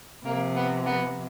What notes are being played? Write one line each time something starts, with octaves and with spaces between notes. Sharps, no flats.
C3 F3 A#3
B3
B3